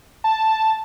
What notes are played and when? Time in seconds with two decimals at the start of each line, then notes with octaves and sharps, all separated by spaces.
0.24 A5